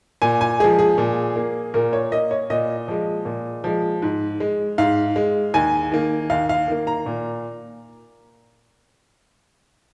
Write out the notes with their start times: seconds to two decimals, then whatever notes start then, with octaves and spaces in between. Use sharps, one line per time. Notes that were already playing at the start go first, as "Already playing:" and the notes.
0.22 A#2 G#5
0.41 G#5
0.60 F3 G#3 G#4
0.79 G#4
0.98 A#2
1.36 A#3
1.74 A#2 A#4
1.93 C#5
2.12 A#3 D#5
2.31 C#5
2.50 A#2 D#5
2.88 F3 G#3
3.25 A#2
3.64 F3 G#3
4.02 G#2
4.40 G#3
4.78 G#2 F5
5.16 G#3
5.54 D#2 G#5
5.92 D#3 A#3
6.30 D#2 F5
6.49 F5
6.68 D#3 A#3
6.87 A#5
7.06 A#2